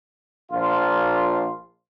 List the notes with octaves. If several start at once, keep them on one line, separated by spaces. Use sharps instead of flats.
A#1 F4